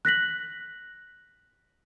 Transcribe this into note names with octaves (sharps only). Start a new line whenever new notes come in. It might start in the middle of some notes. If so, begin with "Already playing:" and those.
F#6 A#6 B6 F#7